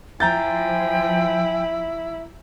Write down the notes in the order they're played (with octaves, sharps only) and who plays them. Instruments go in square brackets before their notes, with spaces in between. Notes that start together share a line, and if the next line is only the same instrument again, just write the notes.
[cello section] F3 [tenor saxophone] E4 [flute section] G5 G#5 [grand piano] A#5 G6 A6